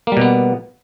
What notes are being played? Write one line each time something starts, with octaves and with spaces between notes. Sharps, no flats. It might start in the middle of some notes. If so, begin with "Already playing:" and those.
B2 G3 A#3 B3